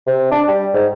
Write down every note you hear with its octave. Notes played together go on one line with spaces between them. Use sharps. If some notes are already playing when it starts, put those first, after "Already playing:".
C3
D4
G3
G#2